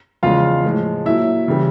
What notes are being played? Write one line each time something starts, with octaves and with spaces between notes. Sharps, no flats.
E2 C#3 F3 G#3 F4 F5
A2 F3 G#3
A#2 F#3 E4 E5
C#3 E3 G3